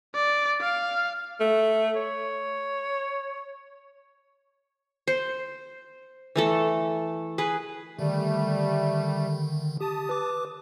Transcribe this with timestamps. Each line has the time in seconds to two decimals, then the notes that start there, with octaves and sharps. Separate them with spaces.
0.15 D5
0.62 F5
1.40 A3
1.96 C#5
5.07 C5
6.36 E3 A3 A4
7.38 G#4 B4
7.99 D3 D#3 G3 A3
9.81 G4 A5 D#6
10.09 B4 D6